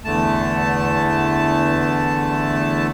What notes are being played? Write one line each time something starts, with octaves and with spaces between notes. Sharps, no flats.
E2 D3 A3 A5